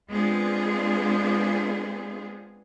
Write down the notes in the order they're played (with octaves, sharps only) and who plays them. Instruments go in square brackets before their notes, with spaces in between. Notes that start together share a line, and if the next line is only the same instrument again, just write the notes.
[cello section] G#3 B3 C4 D4 F4 G#4